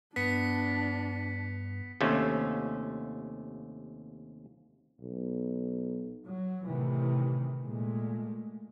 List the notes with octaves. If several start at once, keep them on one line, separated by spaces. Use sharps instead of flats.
G2 B3 D4 B6 C#7
D#2 C3 A3 C#4
B1
F#3
A2 C3 D#3 E3
A#2 G#3 A3